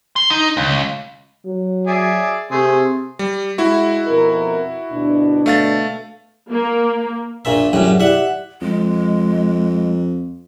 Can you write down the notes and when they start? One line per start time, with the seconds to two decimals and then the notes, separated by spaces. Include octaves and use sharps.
0.16 C6
0.30 D#4
0.57 C#2
1.46 F#3
1.87 G#4 D5 E5
2.51 C3 A3 G#4 C5
3.19 G3
3.58 G#3 E4 F#4
4.07 F2 B2 A#4
4.91 D2 B2 D4
5.46 A3 F5 A6
6.51 A#3
7.45 A#1 A#2 E5
7.73 F#2 A2 F#3 G3 G#4
8.00 E4 G4 D5 E5 F#5
8.62 F2 G#3